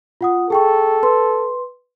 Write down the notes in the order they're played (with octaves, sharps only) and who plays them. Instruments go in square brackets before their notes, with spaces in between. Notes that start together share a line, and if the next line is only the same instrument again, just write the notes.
[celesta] F4 F#5 D#6
[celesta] G#4 G5 C#6 [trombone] A4
[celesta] B4 C6